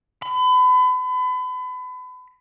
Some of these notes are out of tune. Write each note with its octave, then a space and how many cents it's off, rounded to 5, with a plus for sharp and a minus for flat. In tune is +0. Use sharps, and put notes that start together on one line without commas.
B5 +35